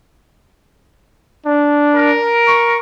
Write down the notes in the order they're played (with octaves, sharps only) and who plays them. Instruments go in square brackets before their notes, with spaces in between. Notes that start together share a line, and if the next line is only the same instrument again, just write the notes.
[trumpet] D4
[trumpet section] A#4
[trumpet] C#6